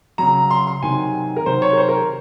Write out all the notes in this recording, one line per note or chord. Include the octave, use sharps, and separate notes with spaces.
C#3 F#3 A#5
C6
C6
C3 D#3 F#3 G#5
A#4
C3 D#3 F#3 C5
C#5
A#4
C5
A#4